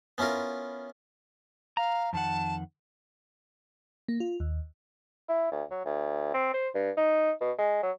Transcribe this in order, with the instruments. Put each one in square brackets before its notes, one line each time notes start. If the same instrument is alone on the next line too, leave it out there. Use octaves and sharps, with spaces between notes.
[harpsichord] B3 C#4 E4 F4 A#4
[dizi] F5 [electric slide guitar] A#5
[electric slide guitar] F2 D#3 F#5 [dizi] A5
[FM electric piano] A#3
F4
D#2
[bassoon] E4
D2
F#3
D2
C4
C5
G2
D#4
B2
G#3
F#3